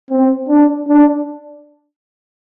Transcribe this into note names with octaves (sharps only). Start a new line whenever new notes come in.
C4
D4
D4